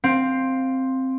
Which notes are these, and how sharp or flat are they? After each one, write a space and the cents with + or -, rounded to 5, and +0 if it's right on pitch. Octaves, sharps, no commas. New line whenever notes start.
C4 +5 F5 +0